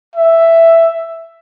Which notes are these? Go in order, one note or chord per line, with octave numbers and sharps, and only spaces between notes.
E5